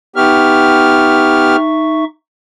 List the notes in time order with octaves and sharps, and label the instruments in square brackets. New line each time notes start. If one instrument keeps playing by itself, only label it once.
[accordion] B3 G4 F6 [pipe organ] D#4 E5 C#6